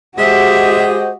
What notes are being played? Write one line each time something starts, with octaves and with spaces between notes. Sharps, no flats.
G#3 F#4 G4 C5 D#5 E5